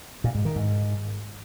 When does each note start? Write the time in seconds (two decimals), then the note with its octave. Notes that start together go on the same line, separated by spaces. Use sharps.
0.24 A#2
0.35 G#2
0.45 D#3
0.56 G#2